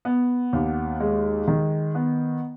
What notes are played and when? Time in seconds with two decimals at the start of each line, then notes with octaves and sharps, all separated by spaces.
0.05 B3
0.53 D#2
1.00 G#3
1.48 D#3
1.95 B3